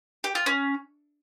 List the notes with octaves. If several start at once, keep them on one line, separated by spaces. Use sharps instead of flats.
G4
F4
C#4